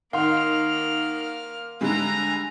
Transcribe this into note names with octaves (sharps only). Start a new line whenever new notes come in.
D#3 A#3 F5 F#5 C6 F6
D3 G3 G#3 G#5 A#5